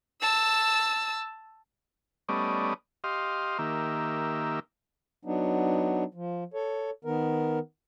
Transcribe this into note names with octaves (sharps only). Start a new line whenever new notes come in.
A5 E6
G3 A3 B3 C#4 D5 D#5
G4 D#5 F5 C6
D#3 A#3 G4 E5
F#3 B3 D4 D#4
F3
A4 C#5
D#3 B3 A#4